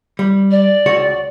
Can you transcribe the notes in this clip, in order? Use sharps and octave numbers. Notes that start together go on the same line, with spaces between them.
G3
D5
C#2 F#4 C#5